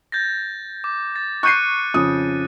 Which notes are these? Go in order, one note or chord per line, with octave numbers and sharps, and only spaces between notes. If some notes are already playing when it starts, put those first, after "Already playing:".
G6 A6 A#6
D6
A6
C#6 F#6 G6 C7 C#7 D#7
F2 C#3 D#6